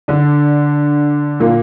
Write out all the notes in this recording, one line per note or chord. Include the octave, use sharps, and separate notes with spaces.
D3 D4
A#2 A#3